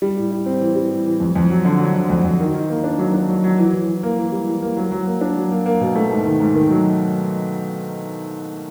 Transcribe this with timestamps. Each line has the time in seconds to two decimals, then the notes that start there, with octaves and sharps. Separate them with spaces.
0.02 G3
0.17 A2
0.31 G3
0.46 C4
0.61 E3
0.75 G3
0.91 A2
1.06 E3
1.20 F2
1.36 F2
1.50 F#3
1.65 D3
1.80 F#3
1.95 D3
2.10 F2
2.24 F2
2.40 D#3
2.55 D#3
2.70 A#3
2.84 D4
2.98 F#3
3.13 D4
3.28 F#3
3.44 F#3
3.58 E3
3.73 E3
3.88 E3
4.03 A#3
4.18 E3
4.32 G3
4.47 E3
4.62 A#3
4.77 F#3
4.92 F#3
5.06 A#3
5.21 D4
5.37 F#3
5.51 A#3
5.66 A#3
5.81 B2
5.95 A3
6.11 G#2
6.26 D#3
6.40 G#2
6.55 D#3
6.71 F#3